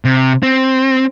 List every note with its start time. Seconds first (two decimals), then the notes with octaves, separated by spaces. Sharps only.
0.05 C3
0.43 C4